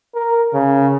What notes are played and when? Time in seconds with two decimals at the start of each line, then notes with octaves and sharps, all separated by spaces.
0.15 A#4
0.53 C#3